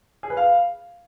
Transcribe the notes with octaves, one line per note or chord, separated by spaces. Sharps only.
G#4
B4
F5